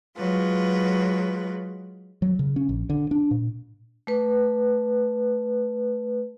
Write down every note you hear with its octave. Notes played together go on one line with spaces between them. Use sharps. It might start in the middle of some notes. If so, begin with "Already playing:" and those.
F#3 G#3 F4 B4
F#3
C#3
C#4
A#1
D3
D4
A#2
A3 B4